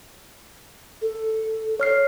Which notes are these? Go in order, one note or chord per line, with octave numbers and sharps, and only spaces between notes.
A4
C#5 F6 C7